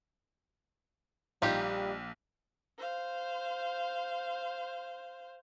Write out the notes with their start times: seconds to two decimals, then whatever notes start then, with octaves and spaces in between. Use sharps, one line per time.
1.42 A#1 G3 D#4 F4 G4
2.78 C5 F5